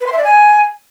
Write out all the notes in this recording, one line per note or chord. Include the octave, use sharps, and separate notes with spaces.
B4
C6
E5
D5
G#5